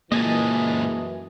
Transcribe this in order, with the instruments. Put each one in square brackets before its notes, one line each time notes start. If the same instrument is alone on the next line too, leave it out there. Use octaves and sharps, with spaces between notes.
[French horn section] F#2 E3 [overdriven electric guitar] A#2 G#3 [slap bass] A#3 [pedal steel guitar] D#5 G#5 A5